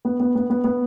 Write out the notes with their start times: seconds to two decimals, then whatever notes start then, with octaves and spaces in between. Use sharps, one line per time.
0.05 B3
0.20 B3
0.35 B3
0.50 B3
0.64 B3